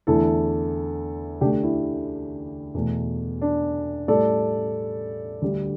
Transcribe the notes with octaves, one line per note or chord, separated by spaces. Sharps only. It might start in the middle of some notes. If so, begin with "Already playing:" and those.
E2 D3 A3 E4 A4
D2 D3 A3 D4 G4
E4
E2 B2 A3
D4
A2 G3 A4 D5
D2 D3 G3